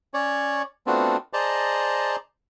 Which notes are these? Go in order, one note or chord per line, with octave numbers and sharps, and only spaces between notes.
C#4 C#5 D5
A3 B3 C4 D4 F4 F#4
G#4 C5 D5 D#5 A5 A#5